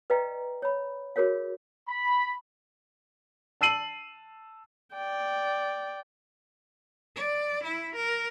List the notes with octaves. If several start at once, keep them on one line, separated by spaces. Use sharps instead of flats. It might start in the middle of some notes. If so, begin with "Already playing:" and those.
B4 D5 D#5 F5 G5 A#5
C#5 B5
F#4 G#4 A#4 C#5 F5
B5
A5 E6 C7 D#7 F#7
D5 G5
D5
E4
A#4